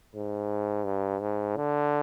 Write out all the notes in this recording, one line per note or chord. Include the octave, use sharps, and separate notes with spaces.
G#2
G2
G#2
D3